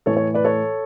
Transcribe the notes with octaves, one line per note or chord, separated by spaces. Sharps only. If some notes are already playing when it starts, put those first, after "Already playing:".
A2 E3 A4 C#5
A4 C#5
B4 D5
A4 C#5